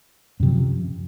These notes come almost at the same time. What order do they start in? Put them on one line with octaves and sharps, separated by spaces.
F#2 C3 F3